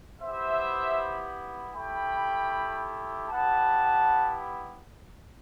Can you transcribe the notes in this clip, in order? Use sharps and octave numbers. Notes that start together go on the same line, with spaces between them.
B3 E4 G4 C5 E5
A3 E4 G4 G5 B5
B3 E4 G4 F#5 A5